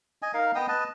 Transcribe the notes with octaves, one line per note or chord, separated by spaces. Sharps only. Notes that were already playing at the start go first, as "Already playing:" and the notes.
D#5 G#5
D#4 A#4 F5
B3 D#5 G5 D#6
B4 D#5 A5